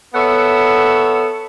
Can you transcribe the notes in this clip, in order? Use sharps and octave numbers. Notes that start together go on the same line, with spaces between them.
B3 A4 C#5 E5 F#5